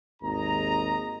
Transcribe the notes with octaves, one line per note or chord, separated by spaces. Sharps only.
G#1 D#2 G#4 D#5 A#5